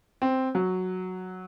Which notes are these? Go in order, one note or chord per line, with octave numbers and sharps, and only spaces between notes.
C4
F#3